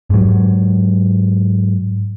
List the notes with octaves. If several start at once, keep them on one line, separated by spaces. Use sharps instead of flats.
G#2 F#3